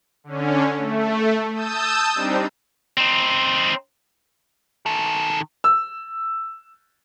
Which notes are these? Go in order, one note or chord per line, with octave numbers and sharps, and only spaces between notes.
D3 C#4
A3
A5 D#6 E6 G6
G3 C4 D4 D#4
C4 D#4
D#3 A4
E6